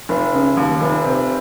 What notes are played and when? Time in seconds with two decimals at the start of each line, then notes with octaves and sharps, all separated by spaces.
0.09 F1
0.33 C#3
0.57 D#2
0.81 F1
1.04 C3